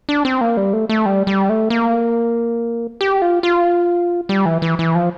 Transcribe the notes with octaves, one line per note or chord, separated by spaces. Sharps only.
D4
C4
A#3
G3
A3
A3
G3
G3
A3
A#3
G4
F4
F4
G3
E3
E3
E3
F3